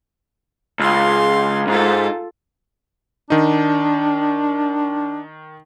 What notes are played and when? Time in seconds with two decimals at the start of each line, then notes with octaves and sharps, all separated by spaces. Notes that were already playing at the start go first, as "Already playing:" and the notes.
0.79 C#2 F5 C6
1.68 G#2 F4 A4
3.30 D#3 D4 D#4